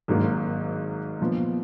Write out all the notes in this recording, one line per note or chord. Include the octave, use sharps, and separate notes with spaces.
G#1 G#2 F#3 A#3
A#2 F3 B3